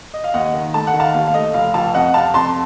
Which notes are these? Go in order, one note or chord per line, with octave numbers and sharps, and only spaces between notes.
D#5
F5
D#2 D#5 F#5
D#3
A3 A5
F#5
D#3
F5 A5
D#2 F5
F5
A3 D#5
F1 F5
F1 F5 A5
F2 D#5 F#5
C3 F5 A5
F2 A5 C6